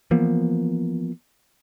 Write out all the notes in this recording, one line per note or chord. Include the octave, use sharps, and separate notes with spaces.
E3 F3 A#3 B3